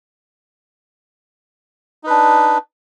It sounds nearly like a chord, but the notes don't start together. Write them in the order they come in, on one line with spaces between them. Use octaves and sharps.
D#4 B4 D4